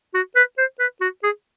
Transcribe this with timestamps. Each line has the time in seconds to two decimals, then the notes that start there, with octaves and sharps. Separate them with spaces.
0.14 F#4
0.36 B4
0.58 C5
0.79 B4
1.01 F#4
1.23 G#4